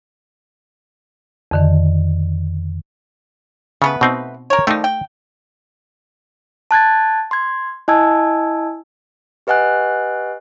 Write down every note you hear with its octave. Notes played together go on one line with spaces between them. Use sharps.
F2 D3 D#3
C#3 A3 B3 B4
B2 C4 D#4
A#4 C#5
D#3 F3 G3 A3 D#4
G5
A5 F#6 G#6 A6
C6 G#6
E4 D#5 G#5 A5 E6 G#6
G4 B4 D#5 F#5 G#5 F#6